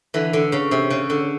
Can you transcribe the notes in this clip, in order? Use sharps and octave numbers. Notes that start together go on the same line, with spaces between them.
D3 E3
D3
C#3
C3
C#3
D3